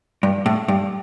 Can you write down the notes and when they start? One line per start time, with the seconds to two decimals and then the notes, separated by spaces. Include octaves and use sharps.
0.23 G2
0.46 A2
0.68 G2